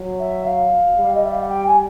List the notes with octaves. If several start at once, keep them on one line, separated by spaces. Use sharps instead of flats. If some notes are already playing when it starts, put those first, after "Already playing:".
Already playing: F#3
E5
F5
G3
D#5
E5
F5
F#5
G5
G#5